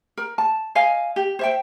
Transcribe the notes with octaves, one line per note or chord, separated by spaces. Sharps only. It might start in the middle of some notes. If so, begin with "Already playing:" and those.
A#4
A5
D#5 F5 G#5
G4
C5 E5 G5